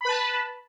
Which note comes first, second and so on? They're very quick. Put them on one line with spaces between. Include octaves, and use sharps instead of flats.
B5 B4 A5